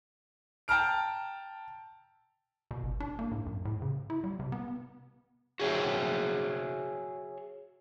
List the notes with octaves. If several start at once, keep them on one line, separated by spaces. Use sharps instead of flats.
G5 A5 A#5 F6 D7
B2
G1
D4
A#3
A2
F#2
A2
C#3
E4
G3
C3
B3
F#4 G#4 C#5 E5 G5